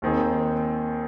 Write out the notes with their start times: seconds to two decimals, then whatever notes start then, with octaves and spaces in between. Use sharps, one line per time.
0.02 D#2 D#3 C4 G#4